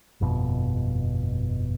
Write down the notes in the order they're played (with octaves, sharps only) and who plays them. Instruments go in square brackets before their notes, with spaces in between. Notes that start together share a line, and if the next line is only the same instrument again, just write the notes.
[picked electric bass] G1 F2 B2